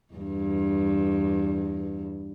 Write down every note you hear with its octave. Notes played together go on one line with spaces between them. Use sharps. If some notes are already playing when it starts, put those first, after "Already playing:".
E2 G2